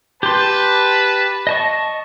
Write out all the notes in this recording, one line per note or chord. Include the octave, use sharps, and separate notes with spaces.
G4 B4 A5 C6
D#5 A5 C#6